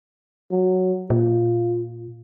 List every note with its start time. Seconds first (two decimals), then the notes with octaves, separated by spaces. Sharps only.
0.51 F#3
1.10 A#2 F4